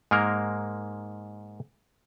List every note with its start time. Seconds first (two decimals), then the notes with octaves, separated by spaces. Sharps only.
0.11 G#2 G#3 A#3 A#4